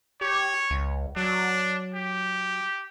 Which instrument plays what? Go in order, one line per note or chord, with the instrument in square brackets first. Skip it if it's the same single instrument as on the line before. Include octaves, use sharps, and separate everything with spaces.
[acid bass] G4 [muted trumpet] C#5
[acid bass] C#2
[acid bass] F#3 [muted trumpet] D4
[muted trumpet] G4